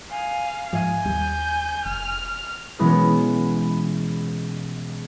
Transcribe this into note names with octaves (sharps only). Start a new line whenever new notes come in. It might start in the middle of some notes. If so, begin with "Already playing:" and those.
F5 G#5
G#2 F3 E5 F5 G#5
D#2 G3 G6
F1 F6
B2 E3 G#3 B3 C#4